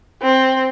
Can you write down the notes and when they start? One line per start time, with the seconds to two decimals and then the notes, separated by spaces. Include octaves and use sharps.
0.22 C4